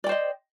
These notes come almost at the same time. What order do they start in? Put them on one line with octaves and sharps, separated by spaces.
D5 G5 C5 D#5